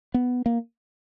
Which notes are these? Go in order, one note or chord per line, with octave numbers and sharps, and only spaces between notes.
B3
A#3